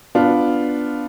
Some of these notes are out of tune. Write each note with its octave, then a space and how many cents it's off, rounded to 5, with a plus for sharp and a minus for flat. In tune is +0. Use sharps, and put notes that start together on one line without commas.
B3 +0 D4 +0 F4 +0